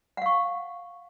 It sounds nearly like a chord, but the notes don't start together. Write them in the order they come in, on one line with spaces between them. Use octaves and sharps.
F#5 F5 C#6